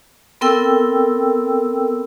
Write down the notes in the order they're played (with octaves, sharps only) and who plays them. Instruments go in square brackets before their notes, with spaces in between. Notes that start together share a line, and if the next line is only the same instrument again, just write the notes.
[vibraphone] B3 C4 A4 A#4 G5 E6